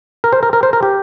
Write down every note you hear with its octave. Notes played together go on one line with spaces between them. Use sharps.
A#4
C5
A#4
A#4
C5
A#4
G4